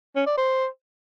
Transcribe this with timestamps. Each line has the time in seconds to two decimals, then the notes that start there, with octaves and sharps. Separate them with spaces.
0.16 C#4
0.27 D5
0.37 C5